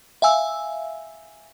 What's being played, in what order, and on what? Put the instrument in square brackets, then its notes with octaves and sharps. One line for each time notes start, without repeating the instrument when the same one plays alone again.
[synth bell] E5 F5 G#5 E6